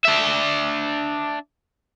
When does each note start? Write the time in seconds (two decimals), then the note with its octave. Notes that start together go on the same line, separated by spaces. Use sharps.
0.05 D4 E5